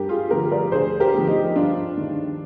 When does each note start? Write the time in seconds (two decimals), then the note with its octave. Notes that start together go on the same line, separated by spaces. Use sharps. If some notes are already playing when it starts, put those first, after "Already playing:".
Already playing: G2 G4 A#4
0.09 F4 G#4
0.30 D3 F3 G4 A#4
0.52 A#4 D5
0.72 D2 G#4 C5
1.00 G4 A#4
1.14 D3 F3
1.28 D#4 G4
1.55 G2 D4 F4
1.97 D#3